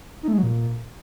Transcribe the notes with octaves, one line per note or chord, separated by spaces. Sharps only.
D#4
A3
G#3
F#3
A#2